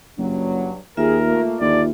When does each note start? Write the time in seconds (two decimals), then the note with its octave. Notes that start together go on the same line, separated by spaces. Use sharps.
0.18 F#1 G2 F#3
0.97 D#2 F4 G#4 A#4 E5
1.28 A3 A#3
1.61 D#2 G#2 D3 D5